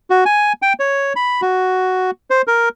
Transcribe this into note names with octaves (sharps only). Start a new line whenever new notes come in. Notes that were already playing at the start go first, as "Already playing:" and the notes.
F#4
G#5
G5
C#5
B5
F#4
C5
A#4